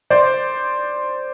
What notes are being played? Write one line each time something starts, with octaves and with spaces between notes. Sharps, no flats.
C5 D5